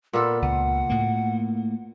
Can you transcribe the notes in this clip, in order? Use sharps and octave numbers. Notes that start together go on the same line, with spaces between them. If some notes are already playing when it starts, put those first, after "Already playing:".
A#2 B3 A4 A#4
C#2 F#5
A2 A#3